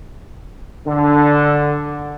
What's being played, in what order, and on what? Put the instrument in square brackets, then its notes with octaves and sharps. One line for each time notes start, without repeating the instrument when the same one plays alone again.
[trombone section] D3